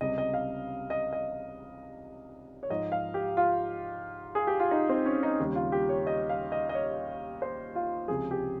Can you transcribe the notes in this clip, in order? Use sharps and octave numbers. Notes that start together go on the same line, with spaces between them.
C#2 C3 G3 D#5
D#5
F5
D#5
D#5
C#5
G#2 F3 D#5
F5
G4
F4
G#4
G4
F4
D#4
C4
C#4
D#4
D#2 C#3 G3
F4
G4
C#5
D#5
F5
D#5
D#5
C#5
C5
F4
C#2 C3 F3 G#4
G4